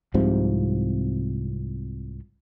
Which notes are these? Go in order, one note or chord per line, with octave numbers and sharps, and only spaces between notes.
C2 G#2 C3 F3